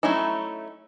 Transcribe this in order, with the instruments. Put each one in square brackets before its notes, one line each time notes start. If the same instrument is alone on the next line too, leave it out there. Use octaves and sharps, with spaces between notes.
[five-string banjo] F#3 A3 C#4 D#4 E4